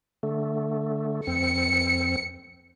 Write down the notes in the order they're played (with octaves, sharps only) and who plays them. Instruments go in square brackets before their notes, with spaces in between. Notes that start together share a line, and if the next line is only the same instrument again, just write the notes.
[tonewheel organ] D3 A3
[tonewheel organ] F2 C4 [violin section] C#7